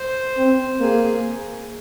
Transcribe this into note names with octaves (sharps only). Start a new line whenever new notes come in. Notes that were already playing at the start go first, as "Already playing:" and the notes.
Already playing: C5
C4
A#3 G#4